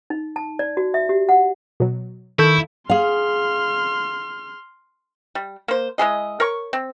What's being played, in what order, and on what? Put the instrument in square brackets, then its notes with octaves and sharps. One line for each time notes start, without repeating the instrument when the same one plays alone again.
[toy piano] D#4
A5
D5
F#4
E5
G4
F#5
[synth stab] B2 F#3
[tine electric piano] D#3 C#6 G6 [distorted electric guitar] E4 [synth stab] A4
[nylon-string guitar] G#4 F5 [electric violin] C6 F6
[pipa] G3
A#3 C5
G#3 E4 G#4 D#5
A#4 C#5 C#6
C4